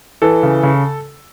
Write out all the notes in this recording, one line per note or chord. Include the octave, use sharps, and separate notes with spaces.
E3 A4
C#3
C#3